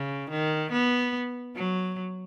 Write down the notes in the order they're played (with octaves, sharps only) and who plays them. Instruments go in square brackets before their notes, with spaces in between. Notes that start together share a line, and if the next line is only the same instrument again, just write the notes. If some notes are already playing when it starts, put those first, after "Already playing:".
Already playing: [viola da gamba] C#3
D#3
B3
F#3